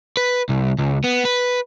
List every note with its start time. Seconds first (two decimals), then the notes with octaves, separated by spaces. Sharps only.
0.17 B4
0.49 C2
0.78 C#2
1.04 B3
1.25 B4